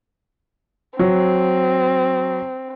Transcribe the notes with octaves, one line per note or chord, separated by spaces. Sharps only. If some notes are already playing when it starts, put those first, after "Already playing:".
F#3 C4